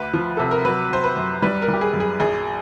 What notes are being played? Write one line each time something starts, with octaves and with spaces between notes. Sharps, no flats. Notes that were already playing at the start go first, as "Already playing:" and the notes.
Already playing: D2 B4
F3
C3 A4
A#4
F#3 B4
F#3 C5
B4
F#2
G3 B4
A#4
G3 G4
G#4
F#2
G#4
A#1 G#4